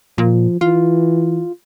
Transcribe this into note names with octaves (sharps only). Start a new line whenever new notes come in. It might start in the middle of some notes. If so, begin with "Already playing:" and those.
A#2 F3
E3 F4